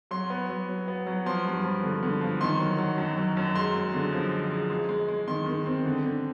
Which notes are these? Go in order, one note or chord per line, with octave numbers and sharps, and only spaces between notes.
F#3 C6
B3
F#3
F#3
B3
F#3
F3 C6
G2
F3
D3
D3
F3
D#3 C6
F#3
F#3
F#2
F#3
F#2
G#3 C6
G#3
D3
F3
G#3
G#3
G#3
G#3
G#3
D#3 C6
D#3
C4
D3
D3